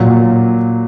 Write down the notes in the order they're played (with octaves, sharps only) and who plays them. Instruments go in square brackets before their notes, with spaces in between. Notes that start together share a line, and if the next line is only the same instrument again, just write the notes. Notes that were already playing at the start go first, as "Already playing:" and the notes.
Already playing: [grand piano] A#2 F#3